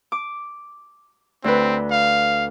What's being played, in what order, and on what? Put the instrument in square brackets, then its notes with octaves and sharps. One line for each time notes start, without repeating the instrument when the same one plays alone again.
[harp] D6
[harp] D2 B4 [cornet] C4
[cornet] F5